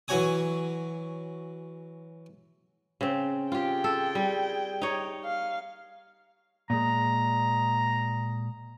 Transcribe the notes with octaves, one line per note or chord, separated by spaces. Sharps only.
E3 F#3 F#4 C#5 G#5 D#6
C#3 C4
F4 G4 G#4 G5
A4
G3
D#4 C#5
F5
A#2 G#3 A#5